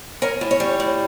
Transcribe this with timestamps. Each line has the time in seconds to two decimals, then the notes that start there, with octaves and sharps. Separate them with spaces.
0.22 C#4 A#4
0.41 A2
0.51 C#5
0.60 G3
0.80 A2